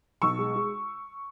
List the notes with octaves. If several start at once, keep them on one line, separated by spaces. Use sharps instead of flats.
B1 C#6 E6
G#3
G#3